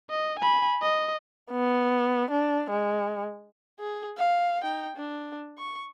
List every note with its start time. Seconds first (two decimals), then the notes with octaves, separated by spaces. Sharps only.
0.10 D#5
0.39 G#5 B5
0.82 D#5
1.51 B3
2.31 D4
2.71 G#3
3.80 G#4
4.17 F5
4.63 D#4 G5
4.96 D4
5.58 C#6